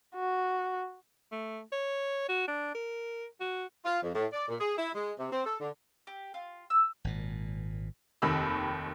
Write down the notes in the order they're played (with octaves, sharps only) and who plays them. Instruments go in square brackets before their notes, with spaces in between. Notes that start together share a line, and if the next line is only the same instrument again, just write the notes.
[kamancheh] F#4
[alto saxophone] A3
C#5
F#4
D4
A#4
F#4
[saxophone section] F4
F2
A2
D5
A#2
G#4
E4
G#3
C3
C4
A4
D3
[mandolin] G4
F4
E6
[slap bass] G#1 A#2
[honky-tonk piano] F1 D#2 D#3 B5 E6